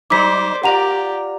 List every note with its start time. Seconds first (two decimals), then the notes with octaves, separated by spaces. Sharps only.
0.10 F#3 D#4 C5 D5 D6 B6
0.64 F4 G4 A#4 D5 F#5 A#5 F7